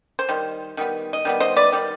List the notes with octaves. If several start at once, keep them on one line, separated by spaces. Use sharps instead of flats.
C5
D#3 G3
D#3 G3 B3
D#5
D#3 G3 B3
C5 D#5
B4 D5
D#3 G3